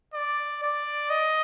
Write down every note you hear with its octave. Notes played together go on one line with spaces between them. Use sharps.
D5
D5
D#5